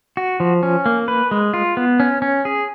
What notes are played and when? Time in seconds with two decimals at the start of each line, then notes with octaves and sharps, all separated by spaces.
0.17 F#4
0.40 F3
0.63 C#4
0.86 A#3
1.08 B4
1.31 G#3
1.54 F4
1.77 B3
2.00 C#4
2.22 C#4
2.45 G#4